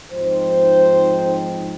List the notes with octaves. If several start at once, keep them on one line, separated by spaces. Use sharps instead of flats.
G#2 F3 C4 D#4 C5